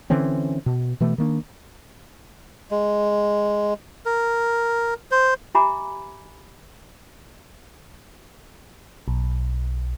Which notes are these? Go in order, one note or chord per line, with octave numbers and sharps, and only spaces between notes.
D3 E3 C4 C#4
B2
B2 E3 A3
D#3 A#3 D4
G#3
A#4
C5
G4 E5 G#5 A#5 B5 D6
B1